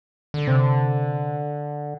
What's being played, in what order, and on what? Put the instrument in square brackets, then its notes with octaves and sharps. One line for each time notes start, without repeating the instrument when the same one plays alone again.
[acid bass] D3
[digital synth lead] C3